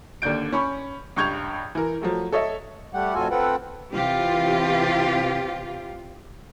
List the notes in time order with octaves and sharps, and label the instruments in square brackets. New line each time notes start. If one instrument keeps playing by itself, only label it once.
[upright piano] D#2 D3 D5 G6 D7
C#4 B5 C#6
C#2 G2 C#6 G6 G#6 F7
E3 A#4
F3 F#3 A3
A4 C#5 D#5 E5
[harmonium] G3 A3 G4 F#5
F2 A2 F4 F#4 A4 G#5
C4 F4 A4 B4 F#5 G5
[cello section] C3 E3 F4 G4